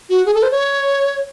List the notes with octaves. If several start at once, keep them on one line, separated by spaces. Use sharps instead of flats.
F#4
G#4
A4
C5
C#5